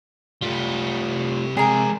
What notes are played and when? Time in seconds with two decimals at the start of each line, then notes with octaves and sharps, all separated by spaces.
0.42 C3 G3 A3 F4
1.57 C3 G#3 G#4 A#4 D5 G#5